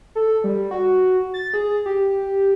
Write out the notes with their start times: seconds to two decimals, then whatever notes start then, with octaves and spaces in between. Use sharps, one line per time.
0.15 A4
0.44 G3
0.71 F#4
1.34 A6
1.54 G#4
1.86 G4